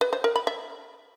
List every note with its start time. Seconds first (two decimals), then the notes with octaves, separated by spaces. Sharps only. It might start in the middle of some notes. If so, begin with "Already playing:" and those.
0.01 B4
0.13 C5
0.24 A#4
0.36 B5
0.47 E5